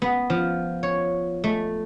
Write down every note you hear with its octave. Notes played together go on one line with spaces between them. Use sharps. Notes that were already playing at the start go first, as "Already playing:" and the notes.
B3
F3
C#5
A3